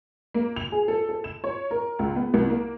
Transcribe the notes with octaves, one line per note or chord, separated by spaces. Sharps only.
A#3
F7
G#4
A4
A4
E7
C#5
A#4
C#2
B3
C2
A#3